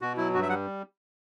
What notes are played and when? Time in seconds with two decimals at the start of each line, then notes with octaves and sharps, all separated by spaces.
0.02 B2 F#4
0.17 F#3 E4
0.34 G2 F#4
0.43 E5
0.50 G3 F#5